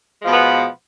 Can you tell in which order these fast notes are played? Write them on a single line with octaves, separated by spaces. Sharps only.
G#3 F3 B2 B3